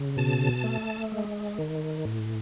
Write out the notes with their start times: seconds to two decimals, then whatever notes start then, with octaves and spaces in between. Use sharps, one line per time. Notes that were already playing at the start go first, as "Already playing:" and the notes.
Already playing: C#3
0.17 B2 A5
0.64 A3
1.12 G#3
1.59 D#3
2.05 A2